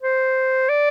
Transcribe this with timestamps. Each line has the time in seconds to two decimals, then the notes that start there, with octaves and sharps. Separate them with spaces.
0.03 C5
0.69 D5